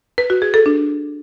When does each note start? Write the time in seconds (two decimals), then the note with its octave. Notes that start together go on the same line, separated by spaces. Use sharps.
0.18 B4
0.30 F#4
0.42 G#4
0.54 A4
0.66 D4